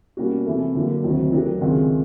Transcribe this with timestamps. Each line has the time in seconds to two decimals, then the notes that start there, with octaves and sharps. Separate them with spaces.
0.17 B2 G3 A#3 C#4 F#4
0.46 C3 E3 A3
0.75 D3 F#3 A#3
1.04 D2 C3 D#3 F#3
1.32 F#3 A3 D4 G4 A#4
1.61 C#2 C3 D#3 G#3 C4